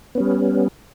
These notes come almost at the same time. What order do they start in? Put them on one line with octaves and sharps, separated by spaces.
B3 C#4 G3